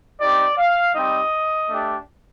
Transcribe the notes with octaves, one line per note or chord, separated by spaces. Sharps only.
C4 D#4 G4 D5
F5
G3 C4 D#4 G4 D#5
A3 D4 G4